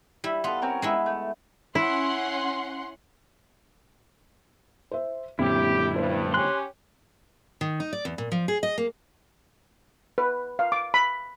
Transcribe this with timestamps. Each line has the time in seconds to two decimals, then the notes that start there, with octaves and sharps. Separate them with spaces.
0.24 G3 E4
0.44 B3 F4 A4
0.62 C4 C#4 A#4
0.82 G#3 B3 E4
1.06 A3
1.75 C#4 E4 F#5 C6
4.91 C5 E5
5.39 F#2 A#2 D3 C4 E4 G4
5.96 G2 C5
6.34 C#4 G4 C6 F#6
7.61 D#3
7.80 D#4
7.93 D5
8.05 E2
8.18 A#2
8.32 F3
8.48 G#4
8.63 D#5
8.78 A#3
10.18 B4
10.59 F5
10.72 D6
10.94 B5